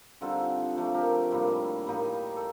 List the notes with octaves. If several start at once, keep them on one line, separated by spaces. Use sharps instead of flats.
D3 G3 C4 D#4 F4 A4
F3 A3 D4
G4 A#4
A2 G3 A#3
A2 G3 A#3 D#4
A4